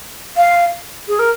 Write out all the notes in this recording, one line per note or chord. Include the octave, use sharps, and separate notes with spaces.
F5
G#4
A#4